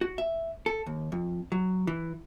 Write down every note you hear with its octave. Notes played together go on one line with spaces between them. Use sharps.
F#4
E5
A4
D#2
F2
F#3
E3